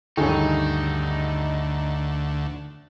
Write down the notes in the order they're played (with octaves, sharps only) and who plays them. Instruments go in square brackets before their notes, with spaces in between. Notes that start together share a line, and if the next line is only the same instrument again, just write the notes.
[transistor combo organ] D2 [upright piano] G2 A4 [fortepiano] D#3 G#4 C#5 [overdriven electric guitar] D#4